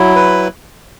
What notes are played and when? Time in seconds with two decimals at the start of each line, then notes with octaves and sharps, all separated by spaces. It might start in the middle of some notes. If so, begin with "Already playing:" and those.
Already playing: F#3 E4
0.16 B4